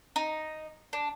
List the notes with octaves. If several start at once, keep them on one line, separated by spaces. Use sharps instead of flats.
D#4
D4